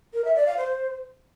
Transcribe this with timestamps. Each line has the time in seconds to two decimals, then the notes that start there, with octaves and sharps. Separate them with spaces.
0.14 A#4
0.25 E5
0.36 D5
0.46 F5
0.57 C5